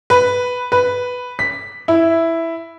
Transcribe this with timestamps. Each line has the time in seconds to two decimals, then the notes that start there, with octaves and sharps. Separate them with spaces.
0.10 B4
0.72 B4
1.39 B6
1.88 E4